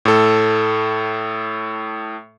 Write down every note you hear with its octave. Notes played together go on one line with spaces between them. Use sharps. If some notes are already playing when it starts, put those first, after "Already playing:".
A2 A4